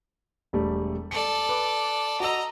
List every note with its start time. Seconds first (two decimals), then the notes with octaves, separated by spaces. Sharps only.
0.53 E1 G3 A3
1.11 A4 D5 C#7
1.49 B4 D6
2.20 F#4 D#5 A#5 E6